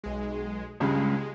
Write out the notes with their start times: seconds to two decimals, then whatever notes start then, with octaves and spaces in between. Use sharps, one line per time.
0.04 B1 G#3
0.80 C#2 G2 C#3 G#3